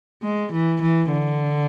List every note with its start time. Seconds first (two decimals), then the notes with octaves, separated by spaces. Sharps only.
0.23 G#3
0.52 E3
0.82 E3
1.12 D3